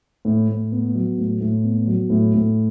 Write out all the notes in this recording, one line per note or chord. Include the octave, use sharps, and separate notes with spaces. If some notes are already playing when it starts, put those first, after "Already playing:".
A2
A2
B3
F#3
A2
A2
B3
F#3
A2
A2